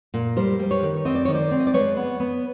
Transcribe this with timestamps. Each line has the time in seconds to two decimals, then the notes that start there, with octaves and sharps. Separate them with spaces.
0.14 A#2
0.37 G3 A#4 C5
0.59 G3
0.71 B4 C#5
0.83 D#3
1.05 C4 D#5
1.15 D5
1.25 D#3 C#5
1.34 C5 D5
1.51 C4
1.60 D#5
1.67 D5
1.74 G#3 B4 C#5
1.96 B3
2.20 B3